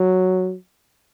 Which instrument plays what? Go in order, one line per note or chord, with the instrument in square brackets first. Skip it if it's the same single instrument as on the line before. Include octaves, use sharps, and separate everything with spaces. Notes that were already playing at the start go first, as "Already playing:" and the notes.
Already playing: [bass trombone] F#3